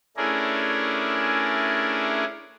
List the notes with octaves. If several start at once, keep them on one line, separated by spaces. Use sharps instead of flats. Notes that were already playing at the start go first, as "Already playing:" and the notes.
A3 C#4 D4 E4 G#4 A#4